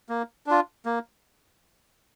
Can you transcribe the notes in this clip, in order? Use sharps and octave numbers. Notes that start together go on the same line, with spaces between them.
A#3
D4 F4
A#3